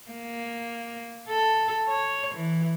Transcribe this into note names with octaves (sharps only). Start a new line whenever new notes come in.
A#3
A4
C#5
E3